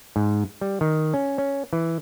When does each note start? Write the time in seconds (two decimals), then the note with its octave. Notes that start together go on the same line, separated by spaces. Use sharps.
0.16 G#2
0.61 G3
0.81 D#3
1.14 C#4
1.38 C#4
1.73 E3